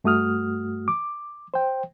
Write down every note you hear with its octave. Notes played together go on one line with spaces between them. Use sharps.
G2 A3 F#4 D#6 F6
D6
C5 G5